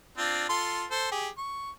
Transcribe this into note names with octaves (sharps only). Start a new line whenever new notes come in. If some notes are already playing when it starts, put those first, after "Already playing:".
C4 D4 F4
F4 A4 C6
A4 C5
G4 G#4
C#6